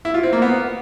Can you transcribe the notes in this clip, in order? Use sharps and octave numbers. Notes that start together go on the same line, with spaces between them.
E4
F4
C4
A#3
B3